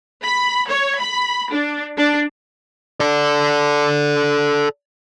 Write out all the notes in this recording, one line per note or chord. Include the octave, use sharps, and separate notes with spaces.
B5
C#5
B5
D4
D4
A4 D5